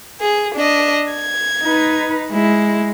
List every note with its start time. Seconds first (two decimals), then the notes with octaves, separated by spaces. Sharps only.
0.21 G#4
0.55 D4 D#5
1.13 G#6
1.63 D#4 B4
2.33 G#3 E4